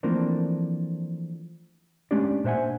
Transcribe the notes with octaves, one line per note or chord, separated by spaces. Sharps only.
E3 F3 A3 A#3 C4 D4
G#3 A3 C#4 D4 G4 D5
A#2 D4 C5 E5 F#5 G#5